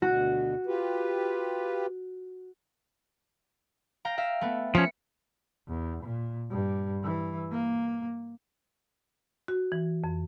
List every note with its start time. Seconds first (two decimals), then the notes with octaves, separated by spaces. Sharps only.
0.02 D2 B2 F#4
0.66 F4 G4 B4
4.05 F5 G5 A#5
4.18 E5 F5
4.41 A3 B3
4.75 F3 C#4 B6 C#7
5.68 E2
6.04 A#2
6.51 G2
7.03 E3
7.52 A#3
9.48 F#4
9.72 E3
10.04 F2